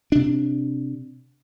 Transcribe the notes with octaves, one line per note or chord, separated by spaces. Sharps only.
C3 D4